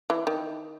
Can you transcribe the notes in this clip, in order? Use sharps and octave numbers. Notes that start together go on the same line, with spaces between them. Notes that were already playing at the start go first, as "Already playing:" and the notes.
E3
D#3